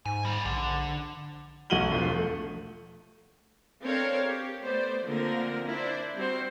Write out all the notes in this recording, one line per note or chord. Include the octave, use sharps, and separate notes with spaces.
G#2 G#5
D#3 G3
A#1 D3
B1 F#4 D#7 F#7 G7
E1 F3
A3
C4 D4 A4 A#4 C#5 F5
G4
A3 B3 C5 D5
D3 F3 A#3 C4 A#4
D4 E4 C5 D5
G3 C4 F#4 C5